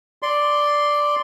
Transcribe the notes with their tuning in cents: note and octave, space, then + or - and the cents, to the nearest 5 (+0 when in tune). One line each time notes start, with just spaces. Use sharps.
D5 +0 C6 +0